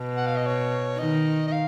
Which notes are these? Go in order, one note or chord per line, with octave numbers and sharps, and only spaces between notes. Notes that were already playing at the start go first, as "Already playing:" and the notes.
Already playing: B2
F#5
F5
D#5
C#5
D#3 D#5
D#5
F5